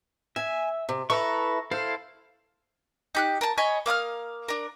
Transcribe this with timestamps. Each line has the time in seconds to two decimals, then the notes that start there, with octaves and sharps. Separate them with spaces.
0.36 E5 G#5
0.89 C3
1.10 E4 A4 B4 A#5 C#6
1.71 E4 A4 C5 F5
3.15 D#4 G4 F#6
3.41 A#4 A5
3.58 C#5 D#5 G#5 B5
3.86 A#3 F5 D#6 F6
4.48 D4 A#4